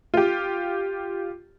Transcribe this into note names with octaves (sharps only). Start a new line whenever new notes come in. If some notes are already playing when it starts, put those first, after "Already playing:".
F4 G4